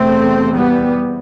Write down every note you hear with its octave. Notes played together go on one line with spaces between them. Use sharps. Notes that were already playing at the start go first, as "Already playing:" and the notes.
Already playing: E2 C3 A3 C4
G3 B3